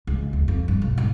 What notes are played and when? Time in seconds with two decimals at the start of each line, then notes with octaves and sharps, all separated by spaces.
0.07 C#2
0.33 D2
0.48 F2
0.68 G2
0.82 B1
0.98 G#2